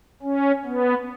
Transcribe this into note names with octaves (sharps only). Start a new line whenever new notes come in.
C#4
B3